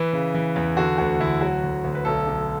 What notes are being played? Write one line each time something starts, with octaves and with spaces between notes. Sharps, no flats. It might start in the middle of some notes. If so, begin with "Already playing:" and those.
Already playing: E3 B4
C#3
E3
E2
D3 F#4
D2 F#4
D2 E4
F#3 F#4
D2
D2
B4
B1 A4
B1